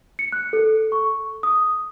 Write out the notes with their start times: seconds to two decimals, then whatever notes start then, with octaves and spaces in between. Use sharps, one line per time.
0.19 C#7
0.32 F#6
0.53 A4
0.92 C#6
1.43 D#6